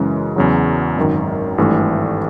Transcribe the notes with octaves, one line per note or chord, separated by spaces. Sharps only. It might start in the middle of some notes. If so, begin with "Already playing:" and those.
Already playing: F#2 C#3 E3 G#3
E2 C#3 F#3
G#1 F#2 D#3
G#1 G2 E3 A3